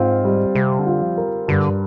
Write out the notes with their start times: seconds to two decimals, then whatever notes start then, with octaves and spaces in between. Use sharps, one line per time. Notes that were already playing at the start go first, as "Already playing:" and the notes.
Already playing: G#2 C4 F4
0.25 G3
0.55 C3 G3
0.79 D3
0.86 F4
1.02 F3
1.17 A#4
1.48 G2 D3